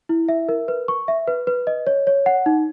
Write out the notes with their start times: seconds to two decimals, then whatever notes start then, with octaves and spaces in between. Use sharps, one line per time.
0.09 E4
0.29 E5
0.49 A#4
0.68 B4
0.88 C#6
1.08 E5
1.27 B4
1.47 B4
1.67 D#5
1.87 C#5
2.07 C#5
2.26 F#5
2.46 D#4